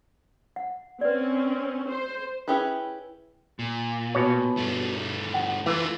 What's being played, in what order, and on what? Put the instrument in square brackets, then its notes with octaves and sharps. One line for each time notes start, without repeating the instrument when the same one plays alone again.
[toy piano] F#5
[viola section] C4 C#4 [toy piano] B4 D5
[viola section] C5
[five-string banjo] C#4 E4 G4 G#4 B4
[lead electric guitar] A#2
[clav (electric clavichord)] B2 C#5
[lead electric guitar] G2 A3
[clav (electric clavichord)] F#5
[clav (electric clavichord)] E3 [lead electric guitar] A3 F4